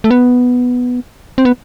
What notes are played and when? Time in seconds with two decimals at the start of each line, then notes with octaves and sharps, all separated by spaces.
0.04 A3
0.10 B3
1.38 C4
1.45 B3